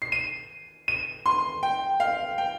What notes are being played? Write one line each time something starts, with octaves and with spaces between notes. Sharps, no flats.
C7
D#7
D#7
C6
G5
F5
G5